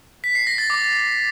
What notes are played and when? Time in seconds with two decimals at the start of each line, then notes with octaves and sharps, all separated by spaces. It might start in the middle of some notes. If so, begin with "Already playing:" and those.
0.24 B6
0.35 C7
0.47 A#6
0.58 A6
0.70 D6